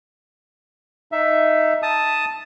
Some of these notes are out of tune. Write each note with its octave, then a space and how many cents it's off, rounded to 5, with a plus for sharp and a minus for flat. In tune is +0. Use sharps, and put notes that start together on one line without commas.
D#4 +0 E5 +10
A5 +0 D#6 +5